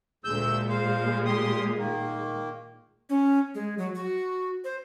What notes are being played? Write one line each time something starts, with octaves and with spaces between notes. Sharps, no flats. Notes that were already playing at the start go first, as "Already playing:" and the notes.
D2 A#2 G#3 E6 G6
C5 F5
G4 C6 D#6
D#3 A#3
C#4
G#3
F#3
F#4
C5